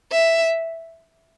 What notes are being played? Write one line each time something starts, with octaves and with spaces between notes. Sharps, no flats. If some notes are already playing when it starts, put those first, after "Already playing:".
E5